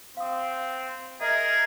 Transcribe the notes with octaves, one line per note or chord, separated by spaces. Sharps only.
C4 F5 D#6
G#4 A#4 D#5 E5